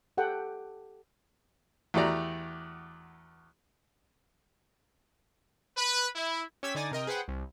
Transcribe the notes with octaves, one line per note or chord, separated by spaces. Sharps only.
G4 A4 F#5 G5
E2 A3 F#4 G4 D5 A#5
B4
E4
C#4 G4 E6 G#6 B6
D3 D#4 D5 G#5 D#6 A6
C3 A#4 D#5 G5
G#4 B4 C5 F#5 G5
C2